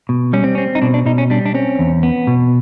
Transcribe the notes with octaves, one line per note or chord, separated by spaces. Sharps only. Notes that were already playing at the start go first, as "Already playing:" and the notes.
B2
G3 C#4
C4
C4 C#4
D#4
B2 D4
D4
B2 D#4
C#4
G3 D4
D4
C4 C#4
E2
B3
B2